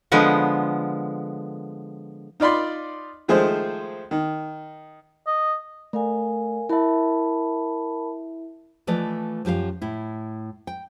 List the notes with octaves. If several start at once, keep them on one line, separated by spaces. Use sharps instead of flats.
D3 F3 G#3 B3
D#4 F4 D5 B5 C6
D#3 F3 G#3 A3 G#4 C5
D#3
D#5
A3 A#4 F5 G#5
E4 A#4 E5 A5 B5
E3 F3 A3 B4 D5 D#5
F#2 F3 G4 A4 F5
A2 E4
G5